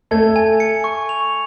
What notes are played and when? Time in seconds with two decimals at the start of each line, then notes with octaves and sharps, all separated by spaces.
0.11 A3 A4 G#6
0.36 G#5
0.60 C#7
0.84 C#6
1.09 F7